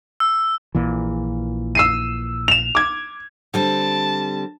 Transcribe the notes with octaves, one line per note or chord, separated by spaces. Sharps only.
E6
A#1 A#2 E3
E6 C7 D#7
E7 F7
D6 G#6
D3 G3 C4 A5